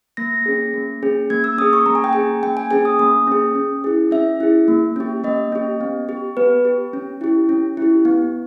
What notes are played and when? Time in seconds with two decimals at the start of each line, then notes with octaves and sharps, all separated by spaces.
0.17 A#3 A#6
0.46 C#4 G#4
0.74 A#3
1.03 C#4 G#4
1.30 A#3 G#6
1.44 E6
1.58 C#4 G#4 D#6
1.73 C#6
1.86 A#3 A#5
1.95 G#5
2.04 G5
2.13 C#4 G#4 G#5
2.43 A#3 G5
2.57 G#5
2.71 C#4 G#4 G#5
2.85 D#6
2.99 A#3 D#6
3.27 C#4 G#4
3.55 C#4
3.84 E4 G#4
4.11 C#4 E5
4.40 E4 G#4
4.68 A#3
4.96 C#4 G4
5.24 A#3 D#5
5.52 C#4 G4
5.81 B3
6.09 G4
6.37 B3 B4
6.65 G4
6.93 C#4
7.21 E4 G4
7.49 C#4
7.77 E4 G4
8.05 B3